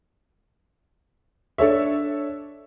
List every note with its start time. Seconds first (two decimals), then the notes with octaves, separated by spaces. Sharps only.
1.58 D4 A4 C#5 E5